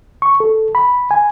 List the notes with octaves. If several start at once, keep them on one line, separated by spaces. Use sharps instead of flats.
C#6
A4
B5
G#5